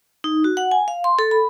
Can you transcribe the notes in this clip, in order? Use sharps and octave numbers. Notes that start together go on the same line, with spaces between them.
D#4
F#4
F#5
G#5
F5
C6
A4
B5